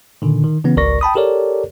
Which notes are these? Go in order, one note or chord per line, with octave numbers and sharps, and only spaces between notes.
A#2 D3 D#3
D#3
C#3 E3 B3 C#4
G#1 C#2 A#4 D5 C#6 A#6
G5 A5 B5 D#6
G4 A4 A#4 C#5 D5